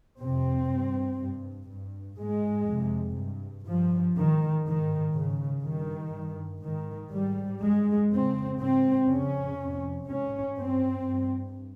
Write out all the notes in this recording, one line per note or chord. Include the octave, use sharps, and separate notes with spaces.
F2 C3 C4
G2
G2
G2
G#2 G#3
F2 C3
G2
G2 F3
G#2 D#3
G#2 D#3
G#2 C#3
G2 D#3
G2
G#2 D#3
G#2 G3
G2 G#3
F2 C#3 C4
G#2 C4
F2 C#3 C#4
F2 C3
G#2 C#4
G2 C4
G2